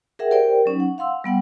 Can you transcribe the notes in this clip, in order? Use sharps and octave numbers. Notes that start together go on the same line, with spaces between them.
G#4 A#4 E5 F#5 G5
G4 A#4 C5 D5 G5
F#3 C#4 D#4
F#5
F5 F#5 C6 E6
G3 B3 F#5 G5